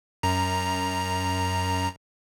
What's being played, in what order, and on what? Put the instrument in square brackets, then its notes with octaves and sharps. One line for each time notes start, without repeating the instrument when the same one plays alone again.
[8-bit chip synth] F#2 A#5